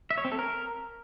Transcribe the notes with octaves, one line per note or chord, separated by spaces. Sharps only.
E5
C#5
C4
A4
A#4